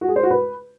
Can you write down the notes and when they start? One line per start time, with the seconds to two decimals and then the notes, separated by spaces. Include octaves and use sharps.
0.01 F#4
0.09 G#4
0.16 C5
0.23 F#4
0.31 B4